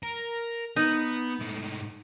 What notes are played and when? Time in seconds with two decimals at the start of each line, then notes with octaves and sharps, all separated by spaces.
0.03 A#4
0.76 B3 D#4
1.39 G#2 A3